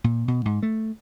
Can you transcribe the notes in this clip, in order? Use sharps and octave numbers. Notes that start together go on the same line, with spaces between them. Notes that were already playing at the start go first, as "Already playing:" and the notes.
A#2
B2
G#2
A3